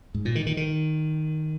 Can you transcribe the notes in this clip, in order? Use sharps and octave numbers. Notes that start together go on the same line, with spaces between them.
G#2
A#2
D#3
D#3
D#3